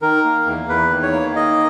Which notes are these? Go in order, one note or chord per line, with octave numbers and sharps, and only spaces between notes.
D#3 A#4
A#3
E2
E2 B4
D#3
C#5
A#3
D#3 D#5